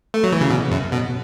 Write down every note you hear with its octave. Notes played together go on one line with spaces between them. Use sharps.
A3
F#3
E3
C#3
B2
F#2
B2